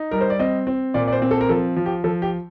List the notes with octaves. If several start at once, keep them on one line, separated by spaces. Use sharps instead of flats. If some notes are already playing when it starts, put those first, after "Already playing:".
Already playing: D#4
G3 A#4
C5
D5
C4 D#5
C4
A#2 D5
D5
C5
C4
A4
A#4
F3 A4
F3
G4
F3 A4
G4